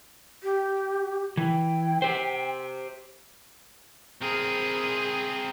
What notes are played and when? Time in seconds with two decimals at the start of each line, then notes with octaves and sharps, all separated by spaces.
0.43 G4
1.37 E3 G5
2.02 G4 C5
4.22 C4 G#4 A#4